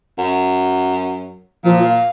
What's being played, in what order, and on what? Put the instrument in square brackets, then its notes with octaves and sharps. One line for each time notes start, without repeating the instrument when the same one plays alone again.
[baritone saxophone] F#2
[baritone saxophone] A#2 [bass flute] F3
[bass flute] F5